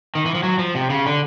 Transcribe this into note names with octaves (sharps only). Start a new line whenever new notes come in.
D#3
E3
F3
F#3
F3
C3
C#3
D3